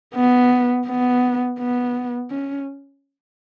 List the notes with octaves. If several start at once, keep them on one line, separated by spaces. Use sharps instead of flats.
B3
B3
B3
C#4